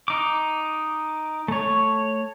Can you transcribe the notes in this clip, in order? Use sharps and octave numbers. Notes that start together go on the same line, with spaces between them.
D#4 D6
A3 C#5